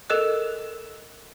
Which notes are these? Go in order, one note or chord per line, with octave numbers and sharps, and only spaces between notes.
A4 A#4 D#5 E6 F#6